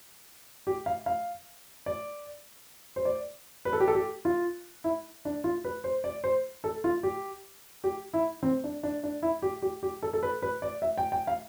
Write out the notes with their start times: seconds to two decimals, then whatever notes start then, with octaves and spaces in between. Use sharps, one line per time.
0.67 G4
0.86 F5
1.06 F5
1.86 D5
2.96 C5
3.05 D5
3.65 B4
3.73 A4
3.80 G4
3.88 A4
3.95 G4
4.25 F4
4.84 E4
5.25 D4
5.44 F4
5.64 B4
5.84 C5
6.04 D5
6.24 C5
6.64 A4
6.84 F4
7.03 G4
7.84 G4
8.13 E4
8.43 C4
8.64 D4
8.83 D4
9.03 D4
9.22 E4
9.42 G4
9.62 G4
9.83 G4
10.03 A4
10.13 A4
10.23 B4
10.42 B4
10.62 D5
10.82 E5
10.98 G5
11.12 G5
11.27 F5